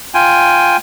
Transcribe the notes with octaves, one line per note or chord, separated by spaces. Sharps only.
F4 G5 G#5